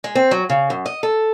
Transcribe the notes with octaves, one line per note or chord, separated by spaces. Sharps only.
G#3
C4
F#3
C#3
F#2
D#5
A4